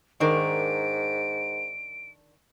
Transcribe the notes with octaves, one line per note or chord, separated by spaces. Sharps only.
G#2 D#3 D4 A#4 D7